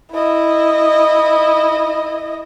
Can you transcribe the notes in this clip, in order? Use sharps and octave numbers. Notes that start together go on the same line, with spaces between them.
E4 D#5